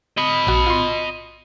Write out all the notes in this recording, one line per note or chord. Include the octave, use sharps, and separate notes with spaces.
D#5 B5
A#1 F#4
F4 C6